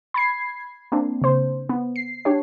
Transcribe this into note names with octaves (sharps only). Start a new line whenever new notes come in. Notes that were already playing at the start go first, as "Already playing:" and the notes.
B5 G#6 C7
A#3 C4 D4
C#3 C5
B3
C7
D4 G4 C#5